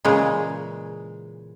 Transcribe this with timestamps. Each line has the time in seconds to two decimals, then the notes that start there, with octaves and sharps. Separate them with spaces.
0.05 A#2 C#3 E3 G#3